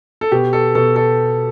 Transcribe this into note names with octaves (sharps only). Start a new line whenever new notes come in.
A4
B2 G4
A4
B2 A4
A4